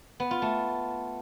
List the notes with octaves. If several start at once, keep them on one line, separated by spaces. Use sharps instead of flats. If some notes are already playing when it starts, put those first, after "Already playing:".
B3
F4
A3